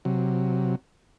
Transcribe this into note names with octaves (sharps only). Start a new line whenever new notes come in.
C3 F#3